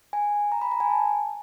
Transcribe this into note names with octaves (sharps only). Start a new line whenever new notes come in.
G#5
A#5
B5
A#5
G#5
A5